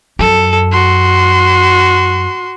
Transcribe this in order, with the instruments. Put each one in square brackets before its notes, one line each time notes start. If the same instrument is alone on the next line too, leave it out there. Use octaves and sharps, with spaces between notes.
[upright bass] F#2 [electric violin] A4
[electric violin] F#4 C6